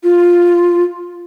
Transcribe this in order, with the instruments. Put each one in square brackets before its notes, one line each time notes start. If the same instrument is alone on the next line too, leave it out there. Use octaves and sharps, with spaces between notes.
[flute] F4